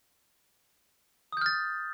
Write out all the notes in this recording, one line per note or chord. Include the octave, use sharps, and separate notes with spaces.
D#6 F6 G6 A6